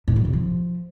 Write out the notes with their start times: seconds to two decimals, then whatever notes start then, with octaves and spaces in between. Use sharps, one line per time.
0.08 A2
0.16 F#3
0.25 C3
0.33 F3